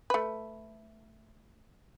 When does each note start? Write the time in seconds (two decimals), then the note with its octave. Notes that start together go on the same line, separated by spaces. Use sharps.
0.10 A3 B4